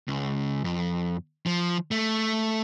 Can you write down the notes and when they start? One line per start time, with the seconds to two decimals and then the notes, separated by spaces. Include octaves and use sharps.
0.08 C#2
0.64 F2
1.46 F3
1.91 A3